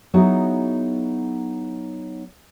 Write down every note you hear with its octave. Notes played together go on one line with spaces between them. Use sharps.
F#3 B3 D#4 E4 F#4 G#4